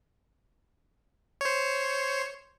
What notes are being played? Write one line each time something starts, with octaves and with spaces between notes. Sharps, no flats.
C5 C#5